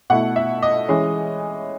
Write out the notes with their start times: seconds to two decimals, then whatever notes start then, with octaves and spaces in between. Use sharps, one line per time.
0.10 B2 A3 E4 F#5
0.36 E5
0.62 D#5
0.89 E3 G#3 C#4